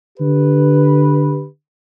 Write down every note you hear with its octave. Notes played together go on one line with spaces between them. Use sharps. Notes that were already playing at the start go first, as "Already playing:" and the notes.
D3 G4 B4